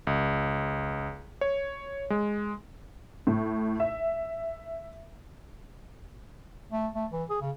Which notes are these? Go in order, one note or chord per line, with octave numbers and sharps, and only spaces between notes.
C#2
C#5
G#3
A2
E5
A3
A3
E3
G#4
C#3